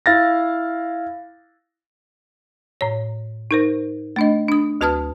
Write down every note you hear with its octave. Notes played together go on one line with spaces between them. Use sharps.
E4 F5 A6 A#6
A2 C#5
D#4 A#4 C5
A3 D4 D#5
D4 D#6
D2 F#4 B4 A5 D#6 F6